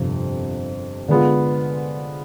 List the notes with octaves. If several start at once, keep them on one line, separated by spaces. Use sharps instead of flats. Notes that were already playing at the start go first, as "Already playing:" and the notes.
Already playing: G1 F2 C3
D3 G#3 B3 F4